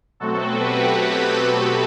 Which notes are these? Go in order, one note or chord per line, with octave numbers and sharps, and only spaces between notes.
B2 F#3 A3 C4 F#4 A4
G4 B4
G4